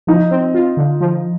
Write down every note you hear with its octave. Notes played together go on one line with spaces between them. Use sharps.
F3 D#4
C4
F4
D3
F3